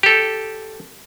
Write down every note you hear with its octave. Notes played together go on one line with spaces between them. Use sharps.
G4 A4